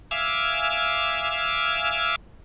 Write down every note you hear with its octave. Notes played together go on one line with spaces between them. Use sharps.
E5 F5 G#5 D6 E6 F6